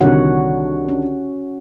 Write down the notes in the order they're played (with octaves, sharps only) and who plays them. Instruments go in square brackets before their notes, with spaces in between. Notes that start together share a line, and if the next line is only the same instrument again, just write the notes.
[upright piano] C2 D3 D#3 [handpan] F#4 C#5 F#5
[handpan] C#4